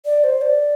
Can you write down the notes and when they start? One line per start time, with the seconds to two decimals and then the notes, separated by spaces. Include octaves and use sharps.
0.06 D5
0.24 C5
0.42 D5